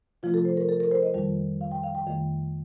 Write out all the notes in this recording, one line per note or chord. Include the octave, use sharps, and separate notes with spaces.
C3 F3 A3 F4
A4
C5
A#4
A4
A#4
C5
D#5
F2 D#3 G3
F5
G5
F5
G5
F2 D#3 A3